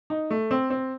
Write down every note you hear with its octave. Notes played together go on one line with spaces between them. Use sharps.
D#4
A3
C4
C4